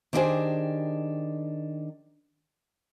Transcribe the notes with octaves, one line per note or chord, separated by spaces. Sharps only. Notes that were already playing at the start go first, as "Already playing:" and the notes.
D#3 D4 E4 G4 G#4 C5